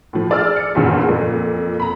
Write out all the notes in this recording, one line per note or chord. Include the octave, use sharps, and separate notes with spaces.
A2 F3
G#4 D5 E6 F6
C#7
F#1 E2 A#2 C#3
F2 A#2
A#5 B5